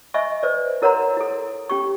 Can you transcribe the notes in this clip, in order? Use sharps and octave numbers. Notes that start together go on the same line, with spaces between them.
D#5 E5 G#5 B5 C#6
B4 C5 D5
E4 A#4 C#5 F#5 A#5 C6
E4 A4
C#4 G4 C#6